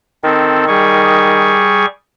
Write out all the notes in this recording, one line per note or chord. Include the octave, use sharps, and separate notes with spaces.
D#3 C4 A4
G3 G#4 C#6